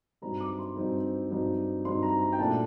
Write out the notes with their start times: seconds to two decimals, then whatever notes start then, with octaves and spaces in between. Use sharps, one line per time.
0.22 G2 F#3 C4 D#4 A#5
0.40 D6
0.59 C6
0.76 G2 F#3 C4 D#4
1.31 G2 F#3 C4 D#4
1.85 G2 F#3 C4 D#4 C6
2.03 A#5
2.21 A#5
2.33 G5
2.39 A#2 F#3 A3 D4 A5